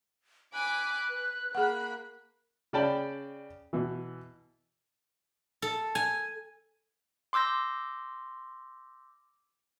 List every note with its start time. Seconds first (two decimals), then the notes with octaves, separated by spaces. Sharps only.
0.54 G#5 B5 D6 F#6
1.09 B4
1.55 A#3 G#4 F#5 B5
2.73 C#3 C#4 D5 G5 A5 B5
3.73 B2 E3
5.62 A4
5.95 G#5
7.33 C6 D6 E6 G6 A#6